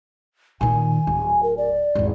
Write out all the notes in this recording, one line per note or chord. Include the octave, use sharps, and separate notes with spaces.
A#2 D#3 G#5
D1
A#4
D5
G#1 E2